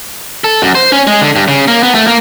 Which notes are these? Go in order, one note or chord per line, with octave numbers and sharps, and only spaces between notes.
A4
F#2
C5
C#4
G#3
D3
G2
C#3
A#3
B3
A3
A#3